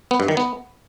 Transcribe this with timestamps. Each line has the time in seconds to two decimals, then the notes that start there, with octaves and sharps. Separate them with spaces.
0.11 B3
0.20 G2
0.28 D#3
0.37 B3